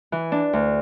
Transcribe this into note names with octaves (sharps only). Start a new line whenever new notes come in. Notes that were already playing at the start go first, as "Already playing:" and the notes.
E3
D4
D2